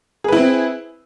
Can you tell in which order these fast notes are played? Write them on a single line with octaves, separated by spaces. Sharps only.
G#4 B4 E4 C4